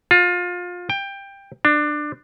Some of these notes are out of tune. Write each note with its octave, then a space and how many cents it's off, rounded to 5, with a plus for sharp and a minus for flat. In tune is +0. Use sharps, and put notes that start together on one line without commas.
F4 +25
G5 +15
D4 +20